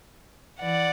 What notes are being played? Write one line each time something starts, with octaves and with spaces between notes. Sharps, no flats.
E3 D5 F#5